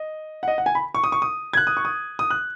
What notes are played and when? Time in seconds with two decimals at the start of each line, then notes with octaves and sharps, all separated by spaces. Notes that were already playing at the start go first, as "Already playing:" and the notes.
Already playing: D#5
0.43 F#5
0.48 D#5
0.58 F#5
0.66 G#5
0.75 B5
0.95 C#6
1.04 D#6
1.12 C#6
1.22 D#6
1.53 G#6
1.57 F#6
1.67 D#6
1.77 C#6
1.85 D#6
2.19 D#6
2.30 F#6